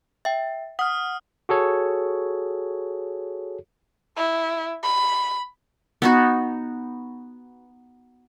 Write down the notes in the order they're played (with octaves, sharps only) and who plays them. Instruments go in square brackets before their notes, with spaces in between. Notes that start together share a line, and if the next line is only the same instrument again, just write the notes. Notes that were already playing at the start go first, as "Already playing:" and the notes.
[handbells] E5 G5
[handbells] F#5 [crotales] D#6 F6
[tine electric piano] F#4 G#4 A4 C#5
[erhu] E4
B5
[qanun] B3 D#4 F#4